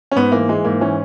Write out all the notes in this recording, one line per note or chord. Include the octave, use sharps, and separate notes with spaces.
C#4
G#2 B3
E3 A#3
E3 G#3
G#2 A#3
E3 C#4